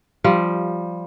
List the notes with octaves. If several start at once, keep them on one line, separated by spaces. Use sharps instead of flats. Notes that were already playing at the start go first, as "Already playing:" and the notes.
F3 G3